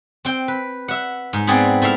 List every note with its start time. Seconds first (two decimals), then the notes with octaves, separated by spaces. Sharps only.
0.25 C4 G5
0.48 B4
0.88 E5 F#5
1.33 G#2
1.47 B3 C4 G#4 D5 F#5
1.82 A3 E4 E5 F5